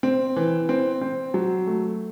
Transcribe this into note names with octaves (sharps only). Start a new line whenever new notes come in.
C4
E3
C4
C4
F#3
A3